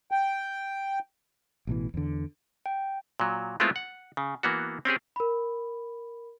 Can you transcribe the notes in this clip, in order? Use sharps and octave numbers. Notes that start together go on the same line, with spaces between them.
G5
A1 B2 E3
E2 D3
G5
A#2 F#3
G#3 A3 B3 C4 E4 F4
F#5
C#3
E3 A#3 B3 F#4
C4 C#4 G4 G#4
A#4 B5